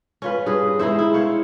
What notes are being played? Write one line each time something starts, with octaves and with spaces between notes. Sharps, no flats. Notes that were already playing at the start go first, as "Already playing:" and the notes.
C#4 F4 B4
G2 G#4 B4
G#3 D#4 E4 C5
E4
C5 C#5 F5